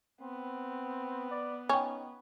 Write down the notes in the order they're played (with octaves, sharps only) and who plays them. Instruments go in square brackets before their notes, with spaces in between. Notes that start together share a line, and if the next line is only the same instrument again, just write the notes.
[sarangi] B3 [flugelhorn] C4
[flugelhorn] D5
[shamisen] C#4 [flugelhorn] D#4 [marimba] G5 C#6